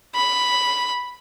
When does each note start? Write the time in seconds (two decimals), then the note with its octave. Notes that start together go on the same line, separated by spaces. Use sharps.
0.15 B5